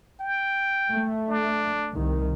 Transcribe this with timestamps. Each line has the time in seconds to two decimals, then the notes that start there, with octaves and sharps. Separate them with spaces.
0.20 G5
0.91 A3
1.28 D4
1.94 C2 D#3